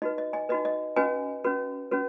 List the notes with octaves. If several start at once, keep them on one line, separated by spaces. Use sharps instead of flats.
D#4 F#4 B4 D#5
D#5
D#5 G#5
D#4 F#4 B4 D#5
D#5
C#4 F#4 B4 D#5 G#5
C#4 F#4 B4
C#4 F#4 B4